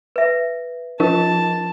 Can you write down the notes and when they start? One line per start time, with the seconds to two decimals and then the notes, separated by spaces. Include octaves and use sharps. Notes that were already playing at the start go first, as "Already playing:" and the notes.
0.16 B4 E5
1.00 F3 D#4 F4 A#4 A5